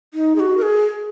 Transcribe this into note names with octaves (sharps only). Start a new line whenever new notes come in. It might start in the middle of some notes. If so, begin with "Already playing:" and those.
D#4
G#4
F#4
A#4
G#4